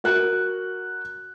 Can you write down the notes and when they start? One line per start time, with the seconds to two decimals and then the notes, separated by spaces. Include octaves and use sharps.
0.04 F#4 A#4 F#6